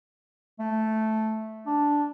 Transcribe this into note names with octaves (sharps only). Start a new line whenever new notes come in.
A3
D4